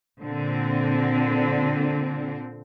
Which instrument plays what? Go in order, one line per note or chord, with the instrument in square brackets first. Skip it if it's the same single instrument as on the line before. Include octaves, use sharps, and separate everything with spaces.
[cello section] A#2 D3 C4